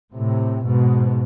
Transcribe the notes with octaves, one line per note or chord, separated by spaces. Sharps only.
A2 C3
G#2 B2